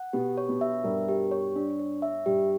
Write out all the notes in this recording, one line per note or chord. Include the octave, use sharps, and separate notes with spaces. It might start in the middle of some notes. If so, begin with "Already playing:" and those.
Already playing: F#5
B2 B3 G4
C#5
B2 B3
E5
G2 G3 A#4
G4
C#5
D4
C#5
E5
G2 G3 G4